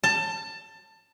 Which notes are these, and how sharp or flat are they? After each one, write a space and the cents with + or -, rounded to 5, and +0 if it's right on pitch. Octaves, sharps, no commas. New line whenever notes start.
A5 +20